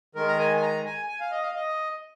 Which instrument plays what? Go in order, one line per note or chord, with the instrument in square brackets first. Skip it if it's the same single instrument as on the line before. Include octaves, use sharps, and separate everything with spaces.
[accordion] D#3 G#3 A#4
A#5
G#5
G#5
A#5
G#5
G#5
F5
D#5
F5
D#5